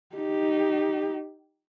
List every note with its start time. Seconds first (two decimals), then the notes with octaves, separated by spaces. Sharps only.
0.16 D#4 G4